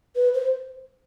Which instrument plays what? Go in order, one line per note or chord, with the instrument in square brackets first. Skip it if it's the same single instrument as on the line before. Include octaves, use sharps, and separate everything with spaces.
[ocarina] B4
C5